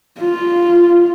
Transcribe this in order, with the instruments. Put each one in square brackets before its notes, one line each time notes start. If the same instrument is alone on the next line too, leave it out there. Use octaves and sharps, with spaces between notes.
[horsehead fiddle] F4